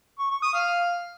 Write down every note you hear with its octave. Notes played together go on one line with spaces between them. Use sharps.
C#6
C#6
D#6
F5